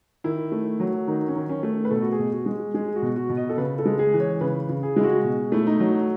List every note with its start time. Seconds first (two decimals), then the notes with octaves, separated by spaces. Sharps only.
0.24 D#3 E4
0.52 A3
0.80 F#3
1.07 D#3 D#4
1.28 C#4
1.35 D#3
1.49 C#4
1.63 A3
1.85 B4
1.90 B2 A4
2.02 F#4
2.12 G#4
2.19 B2
2.32 F#4
2.46 G#3
2.74 G#3 G#4
2.96 F#4
3.02 B2
3.16 F#4
3.29 B2
3.37 D#5
3.49 A4
3.57 C#3 B4
3.78 A4
3.85 G#3
3.99 G#4
4.13 E3
4.20 C#5
4.41 C#3 B4
4.69 C#3
4.83 G#4
4.96 G#3 E4
5.03 F#4
5.24 B2
5.52 A3 E4
5.67 D#4
5.80 F#3